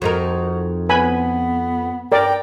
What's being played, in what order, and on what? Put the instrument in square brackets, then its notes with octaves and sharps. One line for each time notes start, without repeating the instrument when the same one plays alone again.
[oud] F2 D#4 A#4 [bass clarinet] F#4
[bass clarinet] B3 [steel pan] B4 G#5 B5
[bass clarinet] G2 [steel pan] A#4 D5 [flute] G5